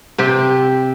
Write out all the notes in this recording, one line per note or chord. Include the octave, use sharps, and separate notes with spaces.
C3 C4 G4